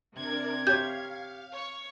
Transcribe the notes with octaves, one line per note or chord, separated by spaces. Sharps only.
C3 D4 A#4 D5 G#6
G4 C#5 F5 G6
C#5 C#6